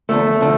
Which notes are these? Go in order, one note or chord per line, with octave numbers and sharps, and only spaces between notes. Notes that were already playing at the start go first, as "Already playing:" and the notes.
E2 D3 F3 A3
D3 F3